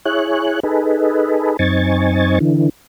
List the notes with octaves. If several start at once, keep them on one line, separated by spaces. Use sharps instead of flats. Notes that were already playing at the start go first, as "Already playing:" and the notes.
E4 G#4 C#5 F#6
D#4 G#4 A4 B4
F#2 C4 D#4 G#5 C#6 A6
D3 E3